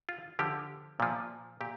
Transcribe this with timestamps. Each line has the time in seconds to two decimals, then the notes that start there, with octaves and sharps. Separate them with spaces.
0.09 F4
0.39 D3 F3 G4
1.00 A#2 F3
1.61 A#2 G4